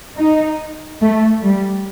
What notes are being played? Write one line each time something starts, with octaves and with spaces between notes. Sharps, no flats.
D#4
A3
G3